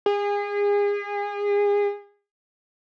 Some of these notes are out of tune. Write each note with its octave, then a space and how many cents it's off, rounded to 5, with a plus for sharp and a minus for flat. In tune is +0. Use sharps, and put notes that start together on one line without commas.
G#4 -30